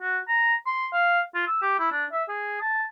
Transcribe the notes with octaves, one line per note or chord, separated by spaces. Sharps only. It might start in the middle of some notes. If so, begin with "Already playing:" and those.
F#4
A#5
C6
F5
F4
E6
G4
E4
D4
E5
G#4
A5